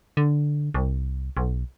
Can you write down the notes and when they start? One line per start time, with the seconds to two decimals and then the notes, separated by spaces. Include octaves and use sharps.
0.17 D3
0.74 C2
1.37 B1